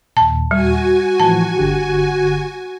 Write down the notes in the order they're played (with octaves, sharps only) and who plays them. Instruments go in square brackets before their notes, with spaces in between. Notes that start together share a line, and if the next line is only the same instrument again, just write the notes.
[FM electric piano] D#2 A#2 [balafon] A5
[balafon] G3 [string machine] F#4 G#5
[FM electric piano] A2 E3 F3 [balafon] A5
[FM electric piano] G1 D3 G4